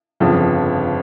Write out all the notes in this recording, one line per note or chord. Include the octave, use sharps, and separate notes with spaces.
G1 F2 C#3 F3